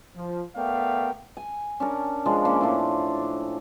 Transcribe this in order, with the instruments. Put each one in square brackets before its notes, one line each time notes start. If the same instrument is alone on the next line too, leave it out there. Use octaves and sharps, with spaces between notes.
[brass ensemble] F3
A3 B3 A#4 D5 F5 G5
[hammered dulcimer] G#5
C#4 D4 A#4
F3 G#3 D4
A#3 C#4 D5 C6
A2 D4